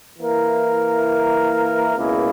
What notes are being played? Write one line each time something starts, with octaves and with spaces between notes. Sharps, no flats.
E3 A#3 E4 A#4
C#2 B2 A#3 E4 G#4